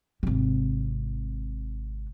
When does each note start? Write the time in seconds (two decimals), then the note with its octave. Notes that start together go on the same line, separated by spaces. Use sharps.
0.23 G#1 C3